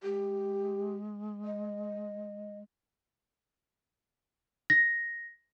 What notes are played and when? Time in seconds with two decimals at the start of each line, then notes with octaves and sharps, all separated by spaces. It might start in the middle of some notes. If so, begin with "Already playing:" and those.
0.03 G#3 G4
1.45 D#5
4.70 A#6